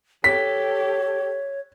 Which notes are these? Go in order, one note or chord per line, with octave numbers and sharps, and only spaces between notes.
G4 A4 C#5 B6